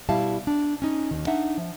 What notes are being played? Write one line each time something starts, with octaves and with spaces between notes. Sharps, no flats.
B2 G3 E4 E5 F5 A5
D4
C#4 D#4
D#2 D#3
D4 D#4 E5 F#5
F3